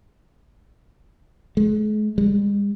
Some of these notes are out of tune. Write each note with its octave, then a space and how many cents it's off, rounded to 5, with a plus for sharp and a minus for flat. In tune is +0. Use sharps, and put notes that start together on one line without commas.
G#3 +40
G#3 -45